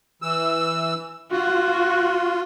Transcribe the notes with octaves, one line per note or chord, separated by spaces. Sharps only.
E3 E6
F4 F#4